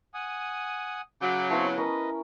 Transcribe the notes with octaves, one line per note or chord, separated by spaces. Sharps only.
F#5 G#5 D#6
C#3 F#3 D6 G6
B3 C4 E4 C#5 F5 A5
C#4 A#4 B4 D#5